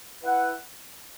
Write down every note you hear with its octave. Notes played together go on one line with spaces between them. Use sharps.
E4 B4 F#5